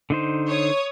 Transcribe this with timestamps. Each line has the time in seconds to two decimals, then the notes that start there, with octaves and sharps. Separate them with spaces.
0.10 D3 D#4 C5
0.48 C#5 D#6